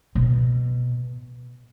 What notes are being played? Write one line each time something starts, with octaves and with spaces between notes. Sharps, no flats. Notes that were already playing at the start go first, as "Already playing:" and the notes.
B2